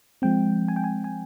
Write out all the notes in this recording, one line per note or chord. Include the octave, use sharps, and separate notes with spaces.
F3 G#3 C4 G5
G#5
G5
G#5
G#5